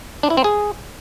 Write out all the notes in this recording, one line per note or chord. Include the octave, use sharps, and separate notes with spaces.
D4
E4
C4
G#4